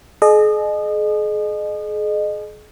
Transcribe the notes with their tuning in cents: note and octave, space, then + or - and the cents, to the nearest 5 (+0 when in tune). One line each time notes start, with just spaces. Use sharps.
G#4 +40 D#5 -30